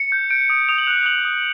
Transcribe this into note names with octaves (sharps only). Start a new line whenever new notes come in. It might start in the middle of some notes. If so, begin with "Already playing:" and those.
Already playing: C#7
G6
G6 D7
D#6
D#6 F7
F#7
F#6 F7
D#6 F#7
D#6